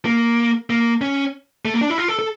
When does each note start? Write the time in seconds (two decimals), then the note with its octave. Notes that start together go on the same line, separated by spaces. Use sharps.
0.05 A#3
0.70 A#3
1.01 C#4
1.65 A3
1.74 A#3
1.81 D4
1.90 E4
1.98 F4
2.08 A4
2.19 A4